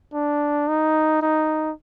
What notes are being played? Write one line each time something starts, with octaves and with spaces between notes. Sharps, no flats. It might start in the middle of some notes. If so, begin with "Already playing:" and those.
D4
D#4
D#4